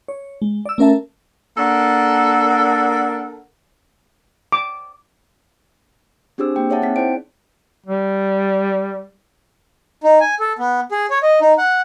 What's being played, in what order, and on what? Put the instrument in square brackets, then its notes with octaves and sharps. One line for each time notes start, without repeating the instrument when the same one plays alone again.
[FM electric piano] C#5
G#3
D5 E6
A3 C#4 A#4 E5 A5
[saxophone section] A#3 D4 A4 A#4 F#5
[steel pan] D6
[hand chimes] C4 D4 G4 G#4 C5 E6
A#3 G5
G#4 C#5 E5 F#5 A5
C4 D#4 B6
E4 C5 D5 G5 D7
[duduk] G3
[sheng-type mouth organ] D#4
G#5
A4
B3
G#4
C#5
D#5
D#4
F#5